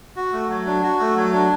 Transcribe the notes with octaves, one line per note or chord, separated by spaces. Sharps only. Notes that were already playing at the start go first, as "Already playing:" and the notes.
F#4
A3
F#3
D4
F#4
A3
F#3
D4